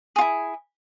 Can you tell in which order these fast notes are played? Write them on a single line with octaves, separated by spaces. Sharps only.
G#4 F4 E4